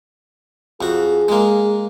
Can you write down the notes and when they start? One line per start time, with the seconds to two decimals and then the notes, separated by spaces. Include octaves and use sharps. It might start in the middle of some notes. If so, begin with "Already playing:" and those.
0.81 F2 F#4 G#4
1.28 G#3 A#3